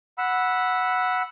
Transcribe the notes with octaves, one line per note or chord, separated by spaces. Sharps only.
F#5 B5 E6